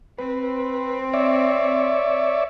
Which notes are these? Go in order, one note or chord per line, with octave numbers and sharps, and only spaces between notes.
C4 B4
C#5 D5 E5